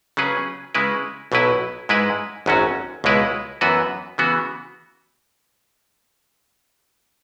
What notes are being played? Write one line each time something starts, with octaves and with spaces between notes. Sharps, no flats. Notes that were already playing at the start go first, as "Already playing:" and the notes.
C#3 F#3 C#4 G#4 B4
C#3 G#3 E4 B4
B1 B2 F#3 E4 B4
G#2 G#3 E4 B4
G#1 F#2 F#3 C#4 F#4
C#2 B2 G#3 E4 B4
F#2 E3 B3 F#4 B4
C#3 E3 B3 F#4